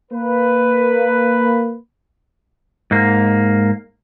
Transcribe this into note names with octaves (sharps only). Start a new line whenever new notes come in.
A#3 B4
G#2 A#3